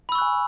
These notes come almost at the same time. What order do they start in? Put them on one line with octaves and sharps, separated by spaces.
B5 E6 C#6 F#6 G#5